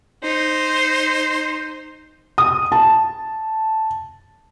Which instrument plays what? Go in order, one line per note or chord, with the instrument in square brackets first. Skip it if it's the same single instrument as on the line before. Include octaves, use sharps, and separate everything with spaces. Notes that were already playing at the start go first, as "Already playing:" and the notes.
[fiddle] D#4 [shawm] C5
[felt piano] D#6
A5